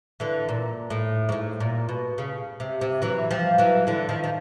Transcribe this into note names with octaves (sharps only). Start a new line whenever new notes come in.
D3 E3
A#2
A2
G#2
A2
A#2
B2
C#3
C3
C3
E3 F#3
F3 G3
E3 F#3
D3 E3
D#3 F3
F3